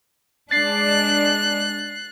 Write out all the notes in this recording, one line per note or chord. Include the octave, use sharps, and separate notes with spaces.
G#3 D4 F#6 A6 C7